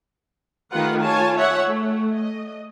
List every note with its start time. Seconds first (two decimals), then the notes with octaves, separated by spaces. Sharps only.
0.72 D#3 A3 F4 G4 B4 F#5
1.03 F4 C#5 G#5 A5
1.37 C#5 E5 F#5
1.68 A3
2.13 D#5